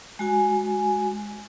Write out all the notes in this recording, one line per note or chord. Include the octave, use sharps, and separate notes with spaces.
G#3 F#4 G#5